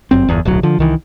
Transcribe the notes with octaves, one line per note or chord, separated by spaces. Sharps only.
G1 F#2 C4
G1 E2
D1 B1 F#3
D3 F3
C2 D#3 E3